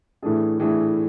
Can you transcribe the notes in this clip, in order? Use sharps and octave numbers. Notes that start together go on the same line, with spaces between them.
A2 E3 A3 D4 G#4
A2 E3 A3 D4 G#4